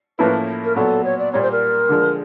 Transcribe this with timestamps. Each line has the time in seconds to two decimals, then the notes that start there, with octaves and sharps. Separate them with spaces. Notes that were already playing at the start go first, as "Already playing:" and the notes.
0.19 A2 F3 A#3 C#4 E4 B4
0.64 A#4
0.76 A#2 F#3 B3 A4
1.04 C#5
1.19 D5
1.33 A#2 G3 A#3 C#5
1.42 C5
1.52 A#4
1.89 D3 F3 G#3